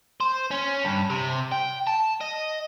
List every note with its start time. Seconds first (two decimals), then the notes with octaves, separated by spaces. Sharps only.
0.20 C5
0.51 C#4
0.84 G2
1.10 C3
1.52 G5
1.87 A5
2.21 D#5